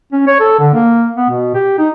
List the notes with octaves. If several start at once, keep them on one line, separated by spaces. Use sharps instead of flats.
C#4
C#5
A4
D3
A#3
B3
B2
G4
D#4